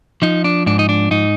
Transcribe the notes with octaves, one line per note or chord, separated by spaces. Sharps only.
F3 D#4
D4
G#2 D4
D#4
D4
G#2 D#4